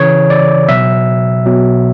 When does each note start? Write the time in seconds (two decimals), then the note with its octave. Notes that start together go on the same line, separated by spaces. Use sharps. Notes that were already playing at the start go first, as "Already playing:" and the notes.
Already playing: C#3 E3 C#5
0.30 D5
0.68 B2 F#3 E5
1.46 B2 F#3